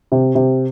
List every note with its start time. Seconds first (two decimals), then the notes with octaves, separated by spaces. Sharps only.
0.12 C3
0.35 C3